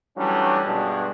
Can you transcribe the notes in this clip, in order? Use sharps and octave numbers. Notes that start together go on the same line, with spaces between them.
E3 F#3 G3 A3 C#4 D4
G2 B2 G#3 D4